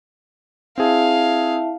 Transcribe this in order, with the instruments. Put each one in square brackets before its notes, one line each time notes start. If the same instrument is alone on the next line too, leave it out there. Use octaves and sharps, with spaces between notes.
[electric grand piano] C4 G#4 [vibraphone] E4 E5 A5 [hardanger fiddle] F5